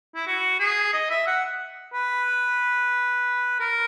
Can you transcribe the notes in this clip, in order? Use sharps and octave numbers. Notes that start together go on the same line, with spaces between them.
E4
F#4
G#4
D#5
E5
F#5
B4
A#4